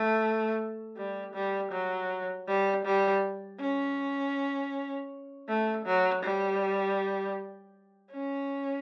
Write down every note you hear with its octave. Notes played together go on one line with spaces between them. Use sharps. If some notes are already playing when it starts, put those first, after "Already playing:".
Already playing: A3
G3
G3
F#3
G3
G3
C#4
A3
F#3
G3
C#4